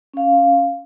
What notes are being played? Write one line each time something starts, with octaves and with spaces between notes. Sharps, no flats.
C#4 F5